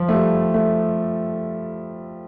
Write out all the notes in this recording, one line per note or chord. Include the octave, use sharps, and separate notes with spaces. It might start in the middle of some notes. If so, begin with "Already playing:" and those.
Already playing: F3
A3
G3
A3